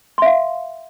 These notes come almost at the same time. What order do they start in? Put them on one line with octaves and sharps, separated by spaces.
C6 E5 F5